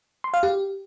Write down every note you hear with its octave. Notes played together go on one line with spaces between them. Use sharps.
C6
F5
G4